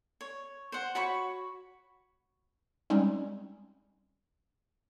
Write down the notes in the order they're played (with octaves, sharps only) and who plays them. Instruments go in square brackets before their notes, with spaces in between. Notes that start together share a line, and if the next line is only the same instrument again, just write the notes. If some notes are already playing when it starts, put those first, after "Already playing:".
[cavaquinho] C#5
C5 F#5
F#4 C#5 B5 C#6
[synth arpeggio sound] G3 G#3 C4 C#4 D#4